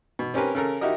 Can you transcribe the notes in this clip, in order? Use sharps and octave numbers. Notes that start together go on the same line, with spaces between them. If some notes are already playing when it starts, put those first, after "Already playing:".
B2
C4 C#4 G4 A#4 B4
C#3 A4 A#4
D#4 E4 F#4 G4 A#4 D#5